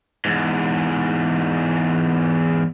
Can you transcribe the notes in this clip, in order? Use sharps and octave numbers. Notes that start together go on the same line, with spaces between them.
E2 G#2